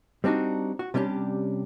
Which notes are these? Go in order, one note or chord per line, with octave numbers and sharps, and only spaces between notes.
G3 C4 D4 D#4 F#4
F#4
C3 G3 C#4 D4 G4